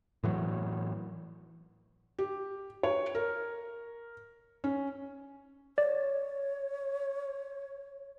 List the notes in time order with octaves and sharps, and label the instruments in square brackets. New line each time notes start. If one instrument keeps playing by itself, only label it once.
[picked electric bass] A2 E3 F#3
[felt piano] G4
C#5
A#4
C#4
[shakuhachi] C#5 [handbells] D5